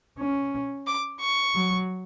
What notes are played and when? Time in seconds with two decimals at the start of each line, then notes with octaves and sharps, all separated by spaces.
0.19 C#4
0.87 D6
1.21 C#6
1.55 F#3